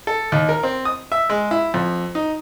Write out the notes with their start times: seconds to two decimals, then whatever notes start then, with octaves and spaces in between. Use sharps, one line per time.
0.07 A4
0.32 D#2
0.49 A#4
0.63 C4
0.85 D#6
1.12 E5
1.30 G#3
1.51 E4
1.74 F2
2.15 D#4